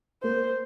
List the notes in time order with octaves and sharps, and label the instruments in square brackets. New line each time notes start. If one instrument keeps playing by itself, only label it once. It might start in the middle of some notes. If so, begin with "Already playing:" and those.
[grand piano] A#3 [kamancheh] C5